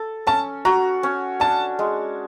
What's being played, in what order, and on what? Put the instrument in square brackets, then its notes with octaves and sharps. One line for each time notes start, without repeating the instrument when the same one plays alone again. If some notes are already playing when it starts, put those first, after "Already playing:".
Already playing: [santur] A4
[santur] C#4 [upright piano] A5
[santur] F#4 [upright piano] A#5
[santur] C#4
[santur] D4 [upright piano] A5
[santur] G#3